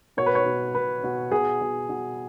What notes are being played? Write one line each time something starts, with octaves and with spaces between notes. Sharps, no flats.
B2 C#5
B4
C#5
B2
B2 B4
B2
B2 G#4
B2
B2